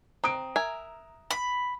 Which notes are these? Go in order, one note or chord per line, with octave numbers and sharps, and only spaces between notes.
C4 A#5 D#6 D7
A#4 E5 G#5
B5